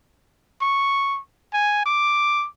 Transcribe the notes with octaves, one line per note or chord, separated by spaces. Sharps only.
C#6
G#5
D6